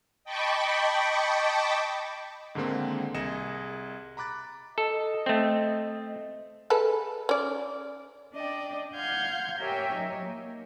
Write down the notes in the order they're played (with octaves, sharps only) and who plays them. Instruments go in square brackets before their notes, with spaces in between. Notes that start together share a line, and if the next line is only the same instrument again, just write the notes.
[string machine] D#5 G5 A5 B5 C#6 D6
[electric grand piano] G#2 D3 D#3 G#3 A#3 C4
C2 G#4 D#5 A#6 C#7 E7
A#5 B5 D6 F#6 A6
[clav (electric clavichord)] A4 [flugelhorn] D#5
[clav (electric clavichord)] A3 C4
[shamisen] G#3 A4 B4
C#4 D5
[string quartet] D4 D5 D#5 G5
F5 F#5 C6 F6 G6 G#6
G4 A#4 C#5 E5 G5 G#5
F#3 D#4 C#5
A#3